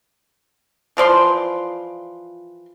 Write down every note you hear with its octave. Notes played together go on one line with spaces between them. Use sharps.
E3 F3 D5 C6